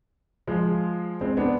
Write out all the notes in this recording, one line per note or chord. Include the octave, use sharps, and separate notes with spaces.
F3 G#3
G#3 C4
B3 D4